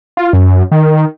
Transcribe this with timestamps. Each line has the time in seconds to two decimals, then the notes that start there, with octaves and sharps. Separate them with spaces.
0.17 F4
0.33 F#2
0.72 D#3